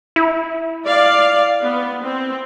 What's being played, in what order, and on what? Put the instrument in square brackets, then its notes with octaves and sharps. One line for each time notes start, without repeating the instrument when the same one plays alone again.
[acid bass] E4
[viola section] D5 F5
B3
C4